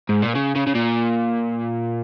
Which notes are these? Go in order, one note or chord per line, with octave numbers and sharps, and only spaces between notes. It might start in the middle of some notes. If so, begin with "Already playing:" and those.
G#2
A#2
C#3
C#3
C#3
A#2